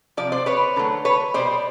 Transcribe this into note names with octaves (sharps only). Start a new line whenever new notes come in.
C3 F3 D5
C5 D5
B4 C#5
D3 F#3 A3
B4 C#5
B2 G3 C5 D5